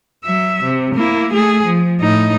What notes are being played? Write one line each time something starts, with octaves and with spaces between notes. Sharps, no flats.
F#3 E5
C3
A#3 E4
A3 G#4
F3
A2 D#4